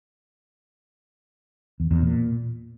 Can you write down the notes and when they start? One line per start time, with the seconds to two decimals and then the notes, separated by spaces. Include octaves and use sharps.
1.80 E2
1.91 E2
2.02 A#2